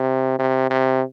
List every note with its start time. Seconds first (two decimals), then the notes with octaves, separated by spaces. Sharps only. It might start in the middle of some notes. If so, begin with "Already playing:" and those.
Already playing: C3
0.39 C3
0.70 C3